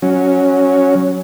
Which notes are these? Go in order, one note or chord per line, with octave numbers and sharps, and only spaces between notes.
F#3 C#4